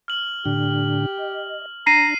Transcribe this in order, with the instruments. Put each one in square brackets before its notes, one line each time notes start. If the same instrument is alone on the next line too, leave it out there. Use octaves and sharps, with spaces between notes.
[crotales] F6 F#7
[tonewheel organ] A2 D3 D4 [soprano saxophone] G4
[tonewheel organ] D#5
[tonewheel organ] D4 [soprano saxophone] A#5 [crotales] C7 D#7